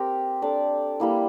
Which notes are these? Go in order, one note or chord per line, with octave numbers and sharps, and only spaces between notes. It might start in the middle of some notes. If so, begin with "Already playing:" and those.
Already playing: C4 G4 A#4
D4 A4 D5
G3 A#3 E4